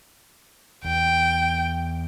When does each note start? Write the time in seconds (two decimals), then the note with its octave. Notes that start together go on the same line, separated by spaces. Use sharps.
0.85 E2 G5